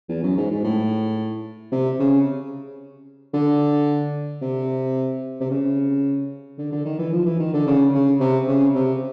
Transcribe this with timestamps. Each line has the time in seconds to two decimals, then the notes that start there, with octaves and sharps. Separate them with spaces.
0.09 E2
0.23 F#2
0.37 G#2
0.51 G#2
0.64 A2
1.72 C3
2.00 C#3
3.34 D3
4.42 C3
5.41 C3
5.51 C#3
6.58 D3
6.72 D3
6.85 D#3
6.99 E3
7.13 F3
7.26 E3
7.40 D#3
7.53 D3
7.67 C#3
7.94 C#3
8.20 C3
8.48 C#3
8.75 C3